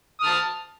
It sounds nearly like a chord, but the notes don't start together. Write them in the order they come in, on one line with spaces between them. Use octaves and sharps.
D#6 F6 A5